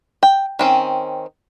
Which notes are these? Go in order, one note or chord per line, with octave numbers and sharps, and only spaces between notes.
G5
D#3 C4 C#4